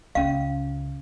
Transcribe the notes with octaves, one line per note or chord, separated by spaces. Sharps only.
C#2 C#4 F5